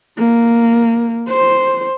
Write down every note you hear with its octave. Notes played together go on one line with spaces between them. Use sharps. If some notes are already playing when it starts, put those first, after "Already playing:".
A#3
C5